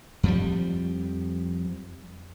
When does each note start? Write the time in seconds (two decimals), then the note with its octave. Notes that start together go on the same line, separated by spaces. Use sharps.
0.23 F2 F3 G3